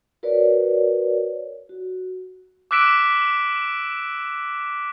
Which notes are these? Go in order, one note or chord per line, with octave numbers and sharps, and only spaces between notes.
F#4 A#4 B4 C#5 D5
F#4
D6 E6 F#6 B6 D7 E7